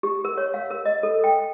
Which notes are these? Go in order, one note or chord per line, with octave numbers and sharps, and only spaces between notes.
G4
A#4
C#5
F5
A#4
D#5
A4
G5